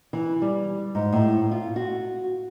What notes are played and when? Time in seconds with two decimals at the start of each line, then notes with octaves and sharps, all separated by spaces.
0.13 E3
0.42 G3
0.95 G#2
1.13 A2
1.51 F4
1.76 F#4